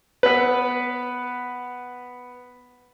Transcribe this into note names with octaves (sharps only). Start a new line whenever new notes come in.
B3 B4